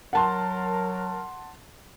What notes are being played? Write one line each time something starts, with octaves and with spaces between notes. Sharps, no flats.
F#3 A#4 F#5 A5 C6